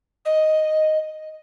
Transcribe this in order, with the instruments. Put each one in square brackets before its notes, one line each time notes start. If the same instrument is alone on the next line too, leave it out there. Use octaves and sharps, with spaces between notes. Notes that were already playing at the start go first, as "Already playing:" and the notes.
[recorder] D#5